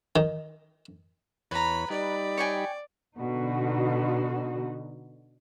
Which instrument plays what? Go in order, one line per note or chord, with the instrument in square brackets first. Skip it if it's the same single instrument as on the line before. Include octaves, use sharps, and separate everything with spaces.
[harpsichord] D#3
[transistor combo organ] E2 C#5 [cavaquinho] B4 A#5 [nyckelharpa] B5
[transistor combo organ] G3 D#4 B5 [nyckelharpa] D5
[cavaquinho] C#5 G5 G#5
[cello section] B2 D3 D#4 F#4